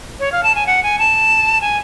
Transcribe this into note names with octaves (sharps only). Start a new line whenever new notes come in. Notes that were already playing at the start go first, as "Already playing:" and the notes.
C#5
F5
A5
G#5
F#5
G#5
A5
G#5